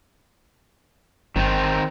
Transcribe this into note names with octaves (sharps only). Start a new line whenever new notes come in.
G1 D#3 C4 D#4